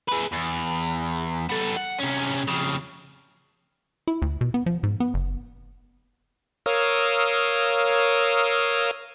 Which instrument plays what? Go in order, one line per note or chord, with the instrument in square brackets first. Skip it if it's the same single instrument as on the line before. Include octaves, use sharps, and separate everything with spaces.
[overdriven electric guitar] G#4 B4
E2
B3 A4
F#5
C3 C#4
F2 C#3
[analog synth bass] E4
D2
B2
B3
F3
G#2
B3
F#1
[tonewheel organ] A#4 C#5 F5 D#6 E6